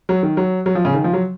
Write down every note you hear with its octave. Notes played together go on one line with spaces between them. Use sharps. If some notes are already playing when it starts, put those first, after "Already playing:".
F#3
D#3
F#3
F#3
F3
C#3
D#3
F3
F#3